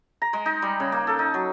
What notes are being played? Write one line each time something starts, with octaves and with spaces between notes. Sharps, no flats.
A#5
G#3
D#4
G3
C#3
A#3
A4
D#4
F#3